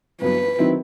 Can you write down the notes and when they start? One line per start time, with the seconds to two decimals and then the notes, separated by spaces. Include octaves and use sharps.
0.22 G2 F#3 B3 B4
0.59 D#3 F#3 C4 E4